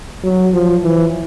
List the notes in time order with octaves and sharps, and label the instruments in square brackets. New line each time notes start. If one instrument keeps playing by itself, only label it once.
[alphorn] F#3
F3
E3